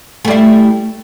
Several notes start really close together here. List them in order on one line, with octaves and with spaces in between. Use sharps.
A3 G3 E4